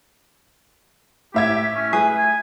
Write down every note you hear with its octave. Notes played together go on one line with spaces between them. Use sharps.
A2 G4 E5 G#6
C#4
G#4 B4
G#5